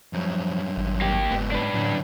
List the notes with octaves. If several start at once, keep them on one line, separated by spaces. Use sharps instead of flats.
F#2 F3 G3
G#1
A#3 G4
F#1 G#2 B3
D4 B4
F#2 A2 D3